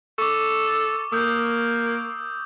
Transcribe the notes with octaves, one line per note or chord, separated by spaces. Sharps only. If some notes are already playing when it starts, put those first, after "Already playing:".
A4 C#6 D6
A#3 D#6 E6 G6